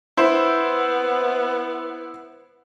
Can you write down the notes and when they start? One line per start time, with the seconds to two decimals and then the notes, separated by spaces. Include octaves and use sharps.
0.17 B3 E4 C5